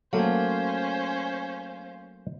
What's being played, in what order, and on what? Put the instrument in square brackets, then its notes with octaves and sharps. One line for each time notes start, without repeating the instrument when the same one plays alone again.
[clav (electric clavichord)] F#3 A3 A#3 [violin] C#4 C5 [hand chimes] F5